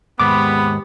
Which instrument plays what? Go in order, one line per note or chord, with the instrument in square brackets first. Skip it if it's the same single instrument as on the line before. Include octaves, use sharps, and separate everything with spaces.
[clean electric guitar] D#2 G#2 G#3 [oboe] B3 [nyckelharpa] G4 B5 [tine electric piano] D6